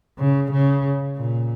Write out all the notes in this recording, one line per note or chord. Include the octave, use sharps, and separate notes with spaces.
C#3
C#3
A#2